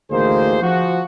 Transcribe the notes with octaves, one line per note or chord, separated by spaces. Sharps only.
A1 D2 D#3 A#3 G#4 C5
F3 F#4